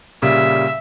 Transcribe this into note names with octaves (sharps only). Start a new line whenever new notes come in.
A#2 C#3 G3 E5